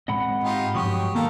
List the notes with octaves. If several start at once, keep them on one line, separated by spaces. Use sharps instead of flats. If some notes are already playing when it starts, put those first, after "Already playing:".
G#2 G#3 C4 D#5 F#5 B5
D#4 F4 G4
G2 F3 F#3 G#3 G4 C#6 D#6
D#3 A#3 A4 A#4